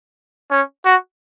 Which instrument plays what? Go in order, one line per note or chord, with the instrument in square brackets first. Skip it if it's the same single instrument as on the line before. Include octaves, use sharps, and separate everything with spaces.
[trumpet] C#4
F#4